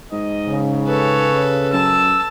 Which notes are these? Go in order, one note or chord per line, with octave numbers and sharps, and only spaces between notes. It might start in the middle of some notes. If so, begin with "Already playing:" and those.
G#2 D#5
C#3
A4 B4 C#5
F#2 A5 E6